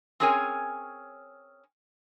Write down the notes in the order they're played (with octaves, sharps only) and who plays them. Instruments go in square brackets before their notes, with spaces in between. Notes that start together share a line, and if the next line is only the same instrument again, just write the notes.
[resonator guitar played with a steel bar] C4 C#4 G#4 A#4 C#5 G#5